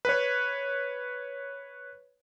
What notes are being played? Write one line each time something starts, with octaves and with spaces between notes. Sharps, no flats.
B4 C#5